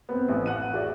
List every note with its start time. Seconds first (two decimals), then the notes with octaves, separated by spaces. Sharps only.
0.09 B3 C4
0.29 A1
0.46 F5 F#5 F#6 D#7
0.73 F#4 G#4 D5 E5